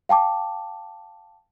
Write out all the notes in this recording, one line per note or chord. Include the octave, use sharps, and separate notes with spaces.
F5 G5 A5 D6